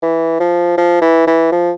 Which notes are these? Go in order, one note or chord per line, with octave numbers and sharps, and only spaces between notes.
E3
F3
F3
E3
E3
F3